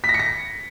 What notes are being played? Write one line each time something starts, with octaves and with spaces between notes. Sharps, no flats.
B6
A#6
C#7
A#6